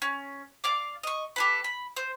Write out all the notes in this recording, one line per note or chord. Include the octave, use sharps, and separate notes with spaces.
C#4
D5 F5 D6
D#5 C#6
G4 A4 B4
B5
C5